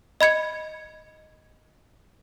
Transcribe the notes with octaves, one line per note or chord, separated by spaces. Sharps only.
D#5 B5 G#6 C#7